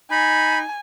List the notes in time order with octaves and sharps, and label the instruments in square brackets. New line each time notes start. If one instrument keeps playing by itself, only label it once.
[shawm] D#4 [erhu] G#5 [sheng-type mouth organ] B5